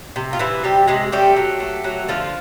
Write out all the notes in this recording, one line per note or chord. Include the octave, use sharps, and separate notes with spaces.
C3
F4
C3 E3 E4
C3 G3 G4
C3 G#3 G#4
G3 A3 G4
F#3
A3
F#3
D3 F3 F4